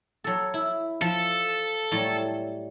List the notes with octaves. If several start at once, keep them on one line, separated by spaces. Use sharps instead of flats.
F#3 A4
E4
F3 A4
A2 F#3 G3